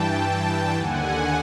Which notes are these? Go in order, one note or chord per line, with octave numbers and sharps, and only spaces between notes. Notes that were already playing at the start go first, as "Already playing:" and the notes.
Already playing: G2 E3 G5 A5
D#2 D3 F#5 G#5